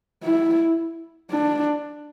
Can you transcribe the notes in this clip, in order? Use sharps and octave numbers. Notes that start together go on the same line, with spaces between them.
E4
D4